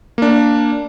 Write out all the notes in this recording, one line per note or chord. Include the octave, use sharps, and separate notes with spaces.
A#3 D4